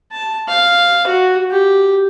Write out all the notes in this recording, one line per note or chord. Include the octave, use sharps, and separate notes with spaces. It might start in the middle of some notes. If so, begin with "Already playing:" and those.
A5
F5
F#4
G4